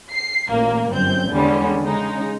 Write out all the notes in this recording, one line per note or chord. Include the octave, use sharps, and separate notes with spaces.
C7
A1 A#2 A#3
G1 F#2 C4 G6
E2 D3 G3 G#3 C#4
C#3 G#3 D#4